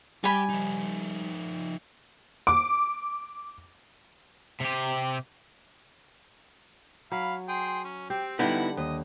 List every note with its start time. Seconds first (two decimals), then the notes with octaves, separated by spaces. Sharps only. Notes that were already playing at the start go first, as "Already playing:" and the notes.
0.24 G3 G4 G5 G#5 B5
0.49 F3 D#4
2.47 D6
4.61 C3 G4
7.12 F#3 F5 B5
7.48 G#4 G5 C6
7.85 C#4
8.10 C4 G4
8.39 D3 G3 B3 D#4 E4 F#5
8.77 D#2 D#5